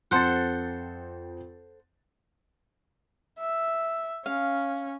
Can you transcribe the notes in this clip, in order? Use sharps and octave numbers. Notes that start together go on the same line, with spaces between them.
F2 C4 A4 C5 F#5 A6
E5
C#4 F5